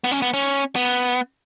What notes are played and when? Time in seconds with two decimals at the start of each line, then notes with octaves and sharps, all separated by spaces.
0.04 B3
0.12 C#4
0.22 B3
0.33 C#4
0.76 B3